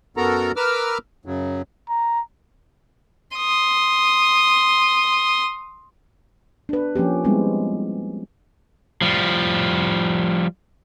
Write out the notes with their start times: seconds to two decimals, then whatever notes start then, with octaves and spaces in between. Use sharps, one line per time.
0.17 F#2 B3 F#4 A4 A#4 A#5
0.56 A#4 B4 D6 E6 F6
1.25 F#2 C#3 F#3
1.90 A#5
3.36 C6 D#6
6.69 D4 B4
6.96 F3 A#3 C#4 G4
7.24 G3 G#3 B3 C4 E4
9.02 F3 G3